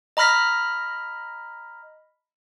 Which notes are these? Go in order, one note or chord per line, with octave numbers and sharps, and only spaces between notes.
D#5 A#5 B5 F6 A#6 B6